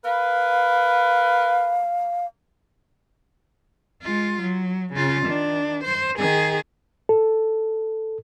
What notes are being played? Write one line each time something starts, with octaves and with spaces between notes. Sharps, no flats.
A#4 B4 F5
G#3 F4
F#3
C#3 F4
D#3 D4
C5
D#3 G#4
A4